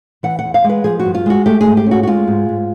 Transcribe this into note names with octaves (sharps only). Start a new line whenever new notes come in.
E3 F#5
F#5
E2
F5
G#3
B4
F3 G#4
F#4
G2
F4
G#3 F#4
A3 G4
G#4
G#2
G4
C#4 F#4
F#4
G#3 F4
G#2
G#2